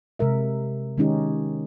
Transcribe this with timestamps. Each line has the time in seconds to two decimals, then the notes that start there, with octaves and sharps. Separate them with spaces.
0.19 C3 G#3 A#4 E5
0.98 D#3 G#3 C#4 D#4 G4